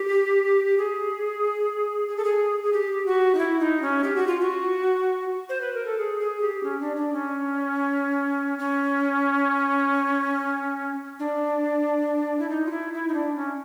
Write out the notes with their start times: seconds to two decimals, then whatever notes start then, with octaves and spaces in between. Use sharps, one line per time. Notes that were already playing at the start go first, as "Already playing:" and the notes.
Already playing: G4
0.78 G#4
2.08 G#4
2.17 A4
2.24 G#4
2.63 G#4
2.73 G4
3.06 F#4
3.35 D#4
3.38 E4
3.59 D#4
3.82 C#4
4.04 G4
4.16 F#4
4.27 F4
4.40 F#4
5.49 C5
5.61 B4
5.74 A#4
5.86 A4
5.99 G#4
6.20 G#4
6.41 G4
6.63 C#4
6.81 D4
6.97 D4
7.13 C#4
8.58 C#4
11.19 D4
12.39 E4
12.50 D#4
12.66 F4
12.71 E4
12.93 E4
13.08 D#4
13.14 D4
13.36 C#4